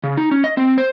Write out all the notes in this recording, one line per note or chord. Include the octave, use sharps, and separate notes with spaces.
C#3
D#4
C#4
D#5
C4
C5